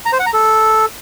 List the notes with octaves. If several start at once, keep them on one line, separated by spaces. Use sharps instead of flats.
A#5
C5
F#5
A#5
A4